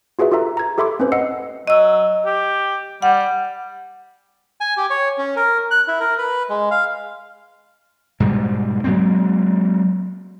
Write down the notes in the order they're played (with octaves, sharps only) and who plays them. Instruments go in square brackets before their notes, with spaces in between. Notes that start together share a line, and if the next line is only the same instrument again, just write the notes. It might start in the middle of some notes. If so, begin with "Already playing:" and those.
[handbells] F4 F#4 G#4 B4 E5
F4 G4 A4 E5 A#5
A#5 G#6
G4 A4 E5 B5 C6 D6
C4 C#4 B4 C5
D#5 F#5 E6 C7 C#7
[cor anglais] F#3 [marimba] D#5 E6
[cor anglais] G4
[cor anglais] G3 [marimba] F#5
[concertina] G#5
G4
C#5
C#4
A#4
F#6
E4
A#4
B4
G#3
F5
[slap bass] G#2 B2 G3
F#3 G#3 A#3 C4